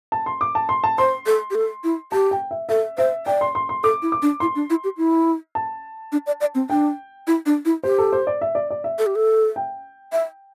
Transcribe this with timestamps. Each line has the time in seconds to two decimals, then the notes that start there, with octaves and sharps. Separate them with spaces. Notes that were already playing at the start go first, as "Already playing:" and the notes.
0.12 A5
0.26 C6
0.41 D6
0.55 A5
0.69 C6
0.84 A5
0.98 C5 C6
1.26 A4
1.51 G4
1.55 A4
1.84 E4
2.12 G4 A5
2.31 G5
2.51 E5
2.69 A4 E5
2.98 C5 E5
3.26 D5 G5
3.41 C6
3.55 C6
3.69 C6
3.83 A4 D6
4.02 E4
4.12 D6
4.22 D4
4.40 E4 C6
4.55 D4
4.70 E4
4.84 G4
4.97 E4
5.55 A5
6.12 D4
6.27 D5
6.41 D5
6.55 C4
6.70 D4 G5
7.27 E4
7.46 D4
7.65 E4
7.83 G4 C5
7.98 A4
8.13 C5
8.27 D5
8.41 E5
8.55 D5
8.70 D5
8.84 E5
8.99 A4
9.06 G4
9.15 A4
9.56 G5
10.12 E5